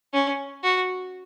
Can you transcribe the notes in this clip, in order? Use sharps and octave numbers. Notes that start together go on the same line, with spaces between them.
C#4
F#4